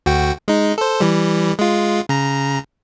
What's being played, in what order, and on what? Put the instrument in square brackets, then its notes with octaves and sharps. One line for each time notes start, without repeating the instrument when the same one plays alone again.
[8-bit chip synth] D2 F#4 G5
G#3 D#4
A4 C5
E3 G3
G#3 F4
C#3 A#5